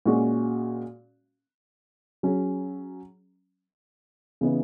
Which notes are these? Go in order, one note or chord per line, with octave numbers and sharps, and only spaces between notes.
A#2 G#3 C#4 F#4
F#3 C#4 G#4
C#3 E3 B3 D#4